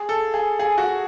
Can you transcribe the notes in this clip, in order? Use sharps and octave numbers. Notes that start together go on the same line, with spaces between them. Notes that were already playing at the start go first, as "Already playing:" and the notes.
Already playing: G#4
A4
G#4
G#4
F#4